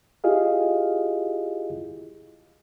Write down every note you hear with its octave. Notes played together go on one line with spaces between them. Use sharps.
E4 F4 G4 G#4 D#5 F5